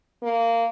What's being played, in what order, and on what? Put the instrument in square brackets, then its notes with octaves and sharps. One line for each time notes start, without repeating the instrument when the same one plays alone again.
[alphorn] A#3